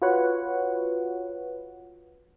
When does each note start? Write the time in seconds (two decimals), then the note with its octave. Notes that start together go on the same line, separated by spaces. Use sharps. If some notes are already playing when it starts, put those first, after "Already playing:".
0.02 F4 F#4 B4 C#5 F#5